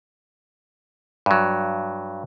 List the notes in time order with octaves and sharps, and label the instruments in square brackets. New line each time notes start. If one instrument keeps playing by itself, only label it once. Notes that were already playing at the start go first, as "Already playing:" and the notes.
[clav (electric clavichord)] G2 F#3